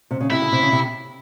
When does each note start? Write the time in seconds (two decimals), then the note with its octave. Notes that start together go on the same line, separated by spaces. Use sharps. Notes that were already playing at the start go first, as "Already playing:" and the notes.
0.11 C3
0.21 C#3
0.30 C3 E4
0.42 C#3
0.52 C3
0.62 C#3
0.72 C3